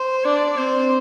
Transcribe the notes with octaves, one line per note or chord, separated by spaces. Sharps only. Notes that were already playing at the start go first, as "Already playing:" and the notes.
Already playing: C5
D4 D5
C4 C5